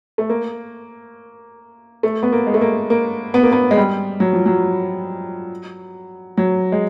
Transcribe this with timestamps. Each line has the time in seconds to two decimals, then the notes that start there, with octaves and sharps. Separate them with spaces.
0.18 A3
0.30 A#3
2.03 A3
2.23 B3
2.32 A#3
2.47 G#3
2.54 A3
2.61 A#3
2.90 A#3
3.34 B3
3.43 A#3
3.52 B3
3.71 G#3
3.77 G3
4.20 F#3
4.33 F3
4.46 F#3
6.37 F#3
6.72 G#3